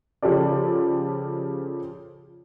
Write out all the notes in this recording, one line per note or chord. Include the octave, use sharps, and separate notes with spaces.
C#3 F3 F4 G4 A4 D5